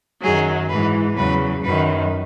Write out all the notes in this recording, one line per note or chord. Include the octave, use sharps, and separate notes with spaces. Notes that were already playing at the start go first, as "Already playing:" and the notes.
F#2 D#3 F#3 G#4
G#2 E3 G#3 B4
E2 C#3 F#3 B4
F#2 D#3 F#3 B4